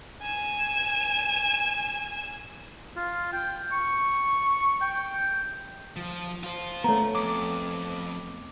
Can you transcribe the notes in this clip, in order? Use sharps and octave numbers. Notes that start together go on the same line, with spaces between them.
G#5 E7
F4
G5
C#6
G5
F3
F4 C5
A3 B3 C#5 A#5
F2 D6